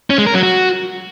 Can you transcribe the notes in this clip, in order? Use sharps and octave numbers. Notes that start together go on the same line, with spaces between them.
C#4
G#3
A#4
F#3
F#4